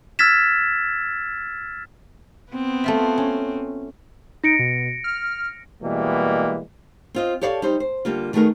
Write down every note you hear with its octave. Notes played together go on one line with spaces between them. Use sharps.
E6 F6 G#6 A6 B6 E7
B3 C4
A3 F4 E5
C#4
D#4 A#6 C#7 D7
B2
F6
B2 E3 G3 G#3 A#3
C4 F4 D#5
G4 A4 C#5 D5 F5 A5
G3 D#4 C5
C5
D3 G3 A#3 F4
D#3 A3 B3 F#4 G#4 A#4